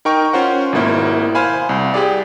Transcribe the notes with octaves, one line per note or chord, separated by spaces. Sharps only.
D#4 A#4 G5 C#6
C#4 F4 C5 F#5
G#1 B2 A#3 E4
C5 F5 G#5 B5
C2
G4 G#4 D5